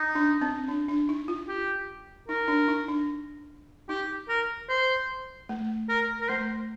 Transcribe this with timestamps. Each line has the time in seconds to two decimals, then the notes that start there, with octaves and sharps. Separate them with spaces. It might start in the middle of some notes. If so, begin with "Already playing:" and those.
Already playing: D#4
0.15 D4
0.42 C4
0.68 D4
0.88 D4
1.09 D#4
1.28 F4
1.48 G4
2.28 D#4 A#4
2.48 D4
2.68 D#4
2.88 D4
3.89 D#4 G4
4.29 A#4
4.69 C5
5.49 A3
5.89 A#4
6.21 A#4
6.29 A3 C5